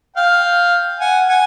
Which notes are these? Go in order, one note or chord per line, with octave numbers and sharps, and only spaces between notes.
F5 G5
F#5 G#5
F#5 G#5